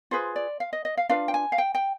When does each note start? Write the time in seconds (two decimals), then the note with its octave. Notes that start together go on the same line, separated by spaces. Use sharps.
0.11 F4 G#4 B4 C5
0.36 D5
0.60 F5
0.73 D#5
0.85 D#5
0.97 F5
1.09 D4 F4 B4 F5
1.28 G5
1.34 G#5
1.52 F5
1.58 G5
1.75 G5